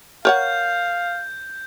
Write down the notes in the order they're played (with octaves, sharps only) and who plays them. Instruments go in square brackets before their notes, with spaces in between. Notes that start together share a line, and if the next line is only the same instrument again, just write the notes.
[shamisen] A#4 C#5 F#5 [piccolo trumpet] F5 [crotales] G6